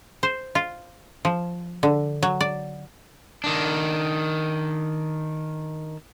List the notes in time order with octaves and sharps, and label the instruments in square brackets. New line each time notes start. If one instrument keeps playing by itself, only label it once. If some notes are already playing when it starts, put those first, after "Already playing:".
[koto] C5
F4
F3
D3
F#3
D5
[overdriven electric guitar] D#3 D4